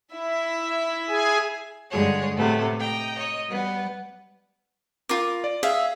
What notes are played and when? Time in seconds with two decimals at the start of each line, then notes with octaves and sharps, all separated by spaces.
0.13 E4 E5
1.09 G#4 G#5
1.90 G2 D3 G3 G#3 G#4 C#5
2.36 A2 C3 A3 B3
2.79 D#5 G5 A#5
3.15 C#5 D#5
3.48 G3 B3
5.09 F4 A#4 D6
5.44 D5
5.63 G#4 E5 F5